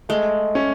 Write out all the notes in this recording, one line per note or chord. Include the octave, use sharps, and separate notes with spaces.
G#3 A3
C#4